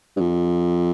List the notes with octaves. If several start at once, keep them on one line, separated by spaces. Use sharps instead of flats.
G2
F2